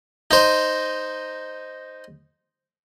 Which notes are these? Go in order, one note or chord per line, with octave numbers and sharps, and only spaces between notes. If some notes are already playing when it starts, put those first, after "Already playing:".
D#4 C5